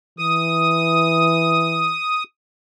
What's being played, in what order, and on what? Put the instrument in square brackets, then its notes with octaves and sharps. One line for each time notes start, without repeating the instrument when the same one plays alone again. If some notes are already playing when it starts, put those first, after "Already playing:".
[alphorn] E3 [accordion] D#6